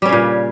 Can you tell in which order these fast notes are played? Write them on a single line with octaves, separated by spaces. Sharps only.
G3 C#4 C#3 A#2